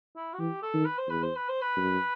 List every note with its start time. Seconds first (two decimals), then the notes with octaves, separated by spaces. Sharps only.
0.16 E4
0.34 F#4
0.39 E3 G4
0.63 A4
0.74 D#3
0.85 B4
0.98 C5
1.07 E2 B4
1.23 C5
1.36 B4
1.49 C5
1.62 B4
1.76 F#2